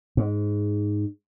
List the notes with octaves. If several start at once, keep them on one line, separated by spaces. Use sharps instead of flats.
G#2